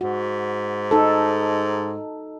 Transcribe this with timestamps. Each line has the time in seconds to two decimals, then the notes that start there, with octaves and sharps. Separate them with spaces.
0.01 G#2 F#4
0.91 D#4 A4